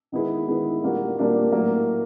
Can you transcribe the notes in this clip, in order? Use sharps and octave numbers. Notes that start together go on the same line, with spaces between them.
D#3 G#3 B3 E4 G#4
D#3 G#3 B3 E4 G#4
A#2 G3 A#3 D4 F#4
A#2 G3 A#3 D4 F#4
A2 F#3 A#3